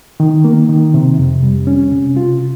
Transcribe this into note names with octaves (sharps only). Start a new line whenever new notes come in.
D#3
A#3
D#3
C3
F2
G3
C#4
C3
F4